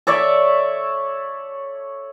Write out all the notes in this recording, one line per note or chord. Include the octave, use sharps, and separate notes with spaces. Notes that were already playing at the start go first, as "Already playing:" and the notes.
A4 C#5 D5 E5